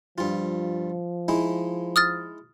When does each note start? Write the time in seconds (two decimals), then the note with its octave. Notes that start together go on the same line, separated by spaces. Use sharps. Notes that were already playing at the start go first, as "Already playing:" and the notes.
0.18 G2 F3 F4
1.28 G#3 D#4 E4
1.96 D#6 F6 A6